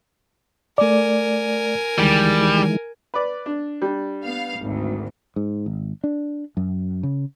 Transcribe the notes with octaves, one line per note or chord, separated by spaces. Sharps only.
A3 A#4 D5 G#5
D2 D#3 E3 G3 G#3
B4 D5
D4
G3 D4
B3 F5
G#1 D2
G#2
G#1
D4
F#2
C#3